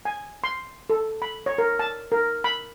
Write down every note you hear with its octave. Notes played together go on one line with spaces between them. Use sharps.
G#5
C6
A4
B5
C#5
A#4
A5
A#4
B5